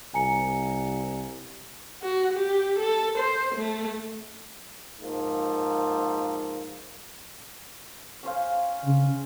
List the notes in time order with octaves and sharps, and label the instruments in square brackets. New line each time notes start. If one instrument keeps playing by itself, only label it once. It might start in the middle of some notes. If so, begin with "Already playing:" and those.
[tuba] C2 [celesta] G#5 A#5 C#7
[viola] F#4
G4
A4
C5
A3
[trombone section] G#2 F3 A#3
[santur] C#4 C5 F5
[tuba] C#3